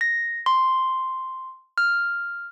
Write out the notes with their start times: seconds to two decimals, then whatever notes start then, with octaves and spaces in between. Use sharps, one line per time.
0.01 A#6
0.46 C6
1.78 F6